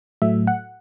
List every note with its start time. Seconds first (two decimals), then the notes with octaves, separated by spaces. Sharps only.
0.22 A2 F#3 A3 E5
0.47 F#5